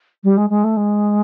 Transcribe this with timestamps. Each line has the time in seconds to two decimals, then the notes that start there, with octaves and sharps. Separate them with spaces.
0.24 G3
0.37 G#3
0.50 G#3
0.64 A3
0.77 G#3